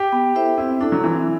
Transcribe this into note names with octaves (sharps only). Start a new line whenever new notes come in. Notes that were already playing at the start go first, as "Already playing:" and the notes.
Already playing: G4
B3
E4 A4 C5 E5
C4 E4
D4 E4 A4
F#3
E3 C4